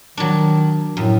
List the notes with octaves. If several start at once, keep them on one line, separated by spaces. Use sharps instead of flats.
D#3 F#3 D4
F#2 A2